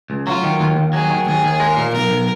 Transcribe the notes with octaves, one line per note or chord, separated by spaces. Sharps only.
C#2
F#3 F4
D#3
D#2
D#2
F#3 G#4
D#3
D#2 G#4
D#2
G#3 A#4
A#2
B1 A#4
B1